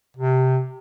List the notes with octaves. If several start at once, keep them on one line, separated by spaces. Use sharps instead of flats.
C3